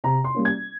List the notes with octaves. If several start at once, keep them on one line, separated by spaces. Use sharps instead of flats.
C3 A#5
C6
G3 A#3 C#4
G#6